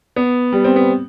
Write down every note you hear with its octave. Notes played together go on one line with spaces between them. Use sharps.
B3
G3
C4
B3